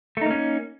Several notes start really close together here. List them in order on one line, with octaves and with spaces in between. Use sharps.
A3 D#4 A#3 C#4